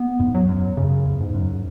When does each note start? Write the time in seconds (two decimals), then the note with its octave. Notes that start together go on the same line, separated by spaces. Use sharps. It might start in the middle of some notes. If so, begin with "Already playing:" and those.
Already playing: B3
0.19 E2 G#2
0.34 F#3
0.49 F#2
0.77 F#2 C#3
1.05 E2
1.20 G#2
1.34 F#2